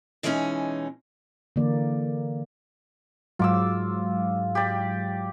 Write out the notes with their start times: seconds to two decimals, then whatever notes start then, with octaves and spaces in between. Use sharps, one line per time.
0.23 B2 E3 G#3 B3 C#4 D#4
1.56 D3 E3 A#3 D5
3.39 G#2 F#3 F4 D6 E6
4.55 G4 D5